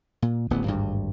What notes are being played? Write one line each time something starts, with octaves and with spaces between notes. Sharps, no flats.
A#2
D1 A1 D2 B3
G#1 D2 G2